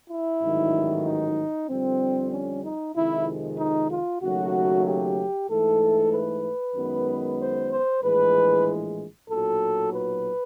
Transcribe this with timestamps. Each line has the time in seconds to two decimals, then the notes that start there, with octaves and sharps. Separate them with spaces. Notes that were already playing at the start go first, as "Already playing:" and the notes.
0.10 E4
0.42 A1 G#2 D#3 F#3
1.05 D#4
1.69 F2 D3 G3 C4
2.32 C#4
2.64 D#4
2.95 F2 C3 D#3 G#3 E4
3.58 D#4
3.91 F4
4.22 D#2 C#3 F#3 A3 F#4
4.86 G4
5.49 G#2 E3 A3 A4
6.13 B4
6.76 F#2 D#3 G#3 B3
7.40 C5
7.71 C5
8.02 A#1 A2 E3 G#3 B4
9.30 B1 A#2 F#3 A4
9.94 B4